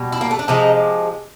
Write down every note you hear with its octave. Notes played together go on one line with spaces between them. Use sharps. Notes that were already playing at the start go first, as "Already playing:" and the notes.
Already playing: B2 G3
E4
A#3
A3
D4
C3 F3 G#3 D#4